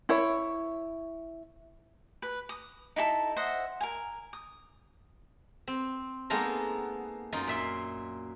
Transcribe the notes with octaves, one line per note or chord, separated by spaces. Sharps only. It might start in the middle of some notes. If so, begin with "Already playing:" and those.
E4 C#5
B4
D#6
D#4 E4 G4 A4
C5 D#5 E5 F#5
A#4 G#5
D#6
C4
G#3 A#3 B3 D#4 A4 A#4
F#2 D#4 F4
A#2 E5 C6